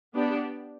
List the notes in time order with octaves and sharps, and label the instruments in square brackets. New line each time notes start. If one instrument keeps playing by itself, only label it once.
[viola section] B3 D4 G4